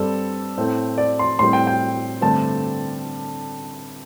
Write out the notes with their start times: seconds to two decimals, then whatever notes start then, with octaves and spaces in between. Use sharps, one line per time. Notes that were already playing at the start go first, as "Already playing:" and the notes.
Already playing: G2 G3 C4 A4
0.58 A2 A3 C4
0.98 D5
1.19 C6
1.39 A2 G3 C4 C6
1.53 G5
1.67 G5
2.21 G2 D3 A3 C4 A5